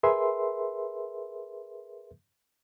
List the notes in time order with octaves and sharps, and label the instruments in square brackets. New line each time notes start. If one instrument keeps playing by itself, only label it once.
[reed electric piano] G#4 A#4 B4 E5 C6